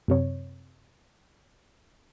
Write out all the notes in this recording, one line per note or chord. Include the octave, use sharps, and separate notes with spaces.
F#2 C3 C#5